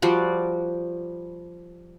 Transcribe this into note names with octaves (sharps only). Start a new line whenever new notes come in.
F3 G3 F#4 D5